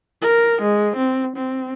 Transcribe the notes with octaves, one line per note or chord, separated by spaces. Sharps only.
A#4
G#3
C4
C4